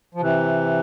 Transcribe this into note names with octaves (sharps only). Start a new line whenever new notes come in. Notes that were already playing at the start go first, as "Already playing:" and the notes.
F3
C3 E3